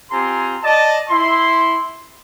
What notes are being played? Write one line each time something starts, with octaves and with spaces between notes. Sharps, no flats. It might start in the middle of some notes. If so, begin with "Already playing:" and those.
C4 F4 G4 G#5 A#5 C6
D5 D#5 A5
E4 C6